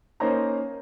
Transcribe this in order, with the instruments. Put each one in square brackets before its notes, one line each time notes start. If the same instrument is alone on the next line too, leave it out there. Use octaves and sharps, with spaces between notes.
[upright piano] A#3 C#4 D#4 C5 A#5